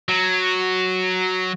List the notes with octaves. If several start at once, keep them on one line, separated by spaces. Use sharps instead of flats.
F#3